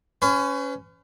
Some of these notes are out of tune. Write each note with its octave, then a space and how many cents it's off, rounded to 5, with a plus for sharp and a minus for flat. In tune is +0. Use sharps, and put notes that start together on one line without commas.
C#4 +10 B4 +45